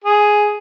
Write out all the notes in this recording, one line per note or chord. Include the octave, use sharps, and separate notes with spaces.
G#4